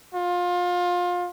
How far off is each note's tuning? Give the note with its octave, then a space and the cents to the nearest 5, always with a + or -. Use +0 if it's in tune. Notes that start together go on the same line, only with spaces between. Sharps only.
F4 +25